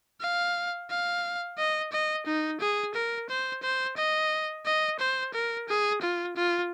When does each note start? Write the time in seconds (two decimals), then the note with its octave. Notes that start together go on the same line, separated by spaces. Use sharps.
0.21 F5
0.90 F5
1.58 D#5
1.92 D#5
2.26 D#4
2.60 G#4
2.94 A#4
3.29 C5
3.63 C5
3.97 D#5
4.66 D#5
5.00 C5
5.34 A#4
5.68 G#4
6.02 F4
6.36 F4